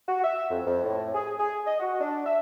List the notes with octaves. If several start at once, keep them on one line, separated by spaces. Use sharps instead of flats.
F#4
E5
F2
F2
A2
G#4
G#4
D#5
F#4
D4
E5